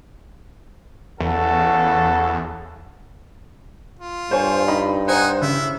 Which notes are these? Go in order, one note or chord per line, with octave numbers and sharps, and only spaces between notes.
E2 C#3 F#4 A4
F4
G2 C5 C#5 G#5
D#4 B5
D#4 C5 F#5 G#5
C#3 E4